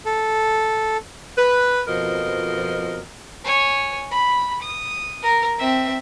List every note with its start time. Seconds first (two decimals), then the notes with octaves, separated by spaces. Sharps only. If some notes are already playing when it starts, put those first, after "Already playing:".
0.06 A4
1.38 B4
1.88 F2 B2 F3 A#4 D#5
3.45 C#5 G#5
4.11 B5
4.62 D#6
5.23 A#4
5.59 C4 E5